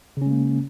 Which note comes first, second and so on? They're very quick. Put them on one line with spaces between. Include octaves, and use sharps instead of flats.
C#3 C#4 G#3 A#3